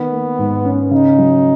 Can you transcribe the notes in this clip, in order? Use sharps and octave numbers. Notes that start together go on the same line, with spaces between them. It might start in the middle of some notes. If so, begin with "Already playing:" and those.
Already playing: D#3 B3
A#3
G#2
C#4
C#3 D#4
F#3